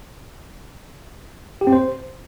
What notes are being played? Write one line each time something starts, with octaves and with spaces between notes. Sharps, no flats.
G4
C4
C5